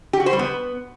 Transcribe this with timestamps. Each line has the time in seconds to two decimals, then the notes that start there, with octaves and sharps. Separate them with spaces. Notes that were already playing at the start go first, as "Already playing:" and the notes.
0.13 G4
0.20 F#4
0.26 C5
0.33 G3
0.39 B3